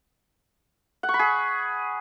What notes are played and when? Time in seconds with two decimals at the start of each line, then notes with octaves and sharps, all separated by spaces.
1.03 F#5
1.09 C#6
1.14 B5
1.19 G#4